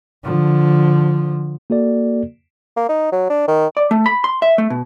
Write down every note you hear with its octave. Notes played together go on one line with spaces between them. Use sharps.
D3 F3
A#3 F#4 A4 D5
A#3
D#4
F#3
D4
D#3
D5
A3
B5
C6
E5
A3
B2